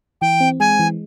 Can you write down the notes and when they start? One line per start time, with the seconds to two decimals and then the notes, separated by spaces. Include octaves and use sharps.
0.21 E3 G5
0.40 C4
0.60 G#3 G#5
0.79 E3